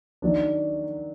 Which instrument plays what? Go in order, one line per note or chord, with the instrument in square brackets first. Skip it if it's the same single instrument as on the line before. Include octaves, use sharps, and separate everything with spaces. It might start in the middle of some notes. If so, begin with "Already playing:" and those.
[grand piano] D#3 F#3 D4